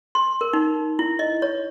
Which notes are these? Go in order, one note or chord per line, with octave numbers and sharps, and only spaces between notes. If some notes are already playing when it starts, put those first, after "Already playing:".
C6
A#4
D#4
E4
D#5
C#5